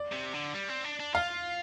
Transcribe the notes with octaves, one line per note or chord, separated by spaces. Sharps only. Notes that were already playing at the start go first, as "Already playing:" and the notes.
Already playing: D5
C3
D3
G3
C4
D4
D4
F4 F5